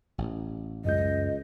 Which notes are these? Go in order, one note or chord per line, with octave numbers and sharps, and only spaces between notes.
A1
C#2 F#2 D#5 G6